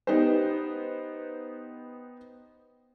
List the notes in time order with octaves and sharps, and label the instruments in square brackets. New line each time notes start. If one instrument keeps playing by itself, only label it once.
[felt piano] B3 D#4 G4 B4 C5